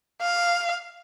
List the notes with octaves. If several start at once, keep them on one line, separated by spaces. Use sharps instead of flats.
F5